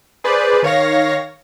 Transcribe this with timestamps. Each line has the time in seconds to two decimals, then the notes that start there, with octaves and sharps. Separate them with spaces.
0.24 G#4 B4 C5 D5
0.63 D#3 C#5 F5 A#6